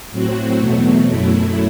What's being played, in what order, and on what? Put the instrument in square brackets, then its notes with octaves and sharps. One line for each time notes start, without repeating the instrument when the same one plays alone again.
[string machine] A2 F#3 C4 F#4
E2 B2 F#3 A3
F#2 F#3 A3 E4